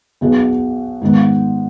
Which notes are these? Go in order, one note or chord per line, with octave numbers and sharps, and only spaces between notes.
B1 B2 B3 G#4
G#2 D#3 B3